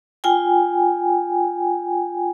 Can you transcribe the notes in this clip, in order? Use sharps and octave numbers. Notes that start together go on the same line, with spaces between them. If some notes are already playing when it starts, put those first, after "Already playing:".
F4 G5 G#5